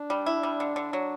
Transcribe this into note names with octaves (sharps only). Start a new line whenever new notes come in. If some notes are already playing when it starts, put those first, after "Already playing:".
Already playing: D4
G3
E4
G3
D3
D3
F#3